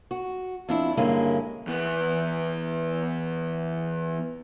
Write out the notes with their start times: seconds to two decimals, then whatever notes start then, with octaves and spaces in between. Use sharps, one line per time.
0.11 F#4
0.69 F2 D4 E4
0.97 G2 D3 G#3 A#3 C#4 E4
1.67 E2 B3